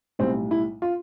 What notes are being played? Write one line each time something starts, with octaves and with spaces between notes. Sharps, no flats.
B1 A2 G3 C4
E4
F4